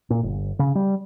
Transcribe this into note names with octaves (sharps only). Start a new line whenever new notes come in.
A#2
G1
C#3
G3